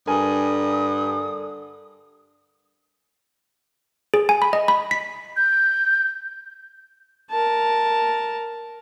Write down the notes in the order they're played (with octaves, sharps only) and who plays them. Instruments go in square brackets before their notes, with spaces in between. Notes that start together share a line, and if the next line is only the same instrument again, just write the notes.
[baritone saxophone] G2 [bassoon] D3 [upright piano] A#4 G#5 [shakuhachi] D#6
[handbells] G#4
G#5
B5
D#5
B5
B6
[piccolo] G6
[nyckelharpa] A#4 A5